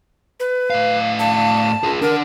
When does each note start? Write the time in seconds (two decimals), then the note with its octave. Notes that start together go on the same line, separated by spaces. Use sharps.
0.40 B4
0.70 A2 F5
1.19 A5
1.83 F4 G#4
2.01 D4 A#4 F#5